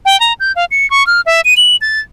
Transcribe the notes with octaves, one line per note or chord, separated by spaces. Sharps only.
G5
A#5
G6
F5
C#7
C#6
F6
E5
D#7
F#7
A6